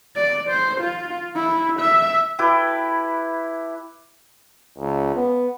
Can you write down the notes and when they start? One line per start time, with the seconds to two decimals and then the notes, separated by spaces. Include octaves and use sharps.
0.16 D5
0.50 C5
0.81 F4
1.36 E4
1.80 E5
2.39 E4 G4 A4 B4
4.78 C#2
5.15 B3